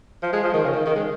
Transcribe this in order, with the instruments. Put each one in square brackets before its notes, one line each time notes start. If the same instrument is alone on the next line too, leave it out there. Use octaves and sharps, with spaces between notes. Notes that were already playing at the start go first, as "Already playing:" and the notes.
[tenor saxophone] F3
G#3
F3
D#3
C#3
D#3
D#3
G#3